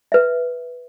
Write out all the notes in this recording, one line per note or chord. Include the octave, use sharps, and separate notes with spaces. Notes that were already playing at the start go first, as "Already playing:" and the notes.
B4 E5